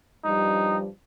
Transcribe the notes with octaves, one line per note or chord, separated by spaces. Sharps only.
G2 F3 G3 D#4